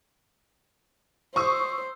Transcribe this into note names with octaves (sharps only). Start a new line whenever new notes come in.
C5 C#6 D#6 E6